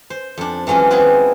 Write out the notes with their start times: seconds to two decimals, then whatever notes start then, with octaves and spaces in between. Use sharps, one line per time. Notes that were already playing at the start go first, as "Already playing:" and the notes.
0.10 C5
0.38 F2 D4
0.67 E3 F#3 G#3 C#4 F4
0.90 B3 C4 E4 F4 G#4 B4